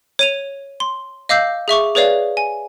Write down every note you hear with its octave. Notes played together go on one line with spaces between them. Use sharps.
C#5 D#7 F7
C6
D#5 F5 D6 E6 G6 C7
G#4 E5 C#6 D6
G#4 B4 C#5 D5 F5
G#5